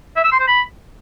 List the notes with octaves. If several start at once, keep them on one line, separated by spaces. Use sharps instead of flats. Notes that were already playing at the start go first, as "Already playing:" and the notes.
E5
E6
C6
C5
B5